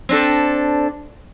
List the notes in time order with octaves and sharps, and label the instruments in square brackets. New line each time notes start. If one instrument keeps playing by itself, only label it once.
[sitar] C4 D4 A4